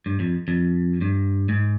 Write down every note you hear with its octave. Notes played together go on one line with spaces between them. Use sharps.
G2
F2
F2
G2
G#2